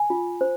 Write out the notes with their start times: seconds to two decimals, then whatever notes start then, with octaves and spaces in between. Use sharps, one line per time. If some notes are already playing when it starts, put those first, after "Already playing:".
Already playing: G#5
0.10 F4
0.41 C5